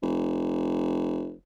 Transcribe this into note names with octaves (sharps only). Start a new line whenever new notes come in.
F1